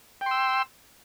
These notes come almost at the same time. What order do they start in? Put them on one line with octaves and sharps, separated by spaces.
G5 C6 E6